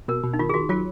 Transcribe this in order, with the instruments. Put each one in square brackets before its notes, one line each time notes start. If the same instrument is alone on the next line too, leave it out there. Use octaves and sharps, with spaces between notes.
[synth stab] B2 [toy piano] A#4
[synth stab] B2
[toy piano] D#4
[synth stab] D#3 [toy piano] F4
[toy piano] G#4
[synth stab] D#3 [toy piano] F#4
[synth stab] F#3 [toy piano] F4